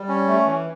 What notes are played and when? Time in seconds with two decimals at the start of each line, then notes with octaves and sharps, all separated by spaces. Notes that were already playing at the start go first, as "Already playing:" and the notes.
Already playing: G3
0.08 C#4
0.27 A3
0.46 E3